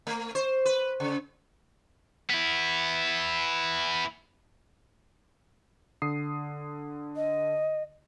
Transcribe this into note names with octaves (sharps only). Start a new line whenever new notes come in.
A3
C5
B4
C#3
B3 E4
D3 D#6 C7
D#5